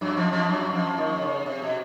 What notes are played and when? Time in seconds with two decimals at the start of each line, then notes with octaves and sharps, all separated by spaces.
0.01 F#2 F#3
0.17 F2 F3
0.33 F2 F3
0.49 F#2 F#3
0.73 F2 F3
0.97 D#2 D#3
1.22 C#3
1.46 C3
1.62 B2